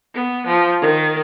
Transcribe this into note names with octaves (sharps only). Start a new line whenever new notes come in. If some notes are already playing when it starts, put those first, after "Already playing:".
B3
F3
D#3